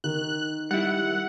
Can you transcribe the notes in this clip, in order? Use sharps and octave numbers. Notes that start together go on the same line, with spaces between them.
D#3 F#6
G3 E4 F#5